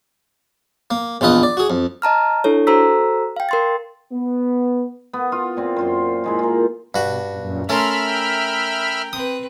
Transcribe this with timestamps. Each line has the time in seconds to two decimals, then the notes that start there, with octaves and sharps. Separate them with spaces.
0.91 A#3
1.21 A#1 E2 F4 B4 D#5
1.43 D5
1.57 F#4 G#4
1.70 F2
2.02 D#5 A5 A#5 F6
2.44 D4 E4 A4 C#5
2.67 F#4 A4 C5 A#5 E6 B6
3.36 F5 G5
3.49 A#4 C6 A6
4.12 B3
5.13 B3
5.32 F4
5.57 A#2 C4
5.77 F#2 F4 C5
6.24 A#2 G#3 E4
6.39 F4 A#4
6.94 G2 B2 F#4
7.29 F#2 A#2
7.69 A3 C#4 A#4 E5 A5 B5 C6 F6
8.07 G5
9.13 C4 B4 D#6